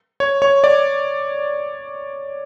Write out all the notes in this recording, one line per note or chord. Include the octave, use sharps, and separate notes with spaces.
C#5
C#5
D5